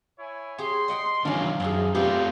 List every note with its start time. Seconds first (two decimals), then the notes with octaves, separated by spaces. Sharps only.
0.18 E4 C#5 G#5
0.58 G4 G#4 C6
0.88 D#5 F#5 G5
1.25 D#3 E3 F#3 C#4 D4 F5
1.60 F#2 F3 G4 G#4
1.95 A3 B3 C4 F4 G4 D5